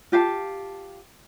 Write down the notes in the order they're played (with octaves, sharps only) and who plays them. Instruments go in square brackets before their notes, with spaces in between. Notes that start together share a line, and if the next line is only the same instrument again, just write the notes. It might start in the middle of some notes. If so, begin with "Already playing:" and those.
[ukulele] F4 G4 F5 A5